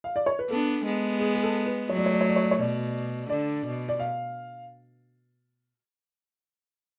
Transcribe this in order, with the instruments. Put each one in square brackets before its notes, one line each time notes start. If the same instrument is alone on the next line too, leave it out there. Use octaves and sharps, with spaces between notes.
[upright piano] F5
D5
C#5
B4
[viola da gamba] B3 D4 [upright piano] A4
[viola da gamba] G#3 B3
[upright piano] G#4
G#4
A4
B4
[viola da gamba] F#3 A3 [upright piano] C#5
[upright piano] D5
C#5
D5
C#5
D5
C#5
D5
C#5
[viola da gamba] B2 [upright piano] D5
[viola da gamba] D3 [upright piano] D5
[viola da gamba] B2
[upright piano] D5
F5